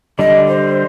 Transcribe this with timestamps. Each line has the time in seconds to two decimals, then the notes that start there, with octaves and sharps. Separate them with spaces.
0.19 D3 G3 D4 D#5
0.48 C5